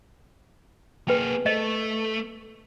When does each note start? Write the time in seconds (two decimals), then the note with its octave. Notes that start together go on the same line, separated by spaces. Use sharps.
1.08 A#3 G#4 B4 G5
1.46 A3 D#5